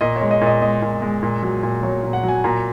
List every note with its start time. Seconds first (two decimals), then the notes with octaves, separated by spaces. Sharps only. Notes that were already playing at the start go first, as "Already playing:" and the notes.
0.01 A#2 D#5
0.16 C#5
0.21 G#3
0.31 D#5
0.41 A#2
0.47 D#5
0.62 G#3 D#5
0.82 A#2
1.02 G#3
1.23 A#2
1.42 F#3
1.63 A#2
1.83 F#3 C#5
2.03 A#2
2.13 F#5
2.23 F#3
2.28 G#5
2.44 A#2 A#5